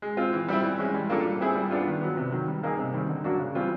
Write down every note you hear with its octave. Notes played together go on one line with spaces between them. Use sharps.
G#3
C4 F4
E3
G3 C4 E4
E3
G#3 C#4
G3
A#3 D4 F4 A4
G3
C4 E4 G#4
G3
B3 D4 F4
D#3
F#3 B3
C3
D#3 F#3
G3
A#3 D#4 G#4
C3
D#3 G3 C4
D3
F#3 A#3 D4 F#4
C#3
E3 G3 C4 F4